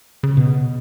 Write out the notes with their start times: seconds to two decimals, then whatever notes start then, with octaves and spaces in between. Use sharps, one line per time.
0.23 C#3
0.37 B2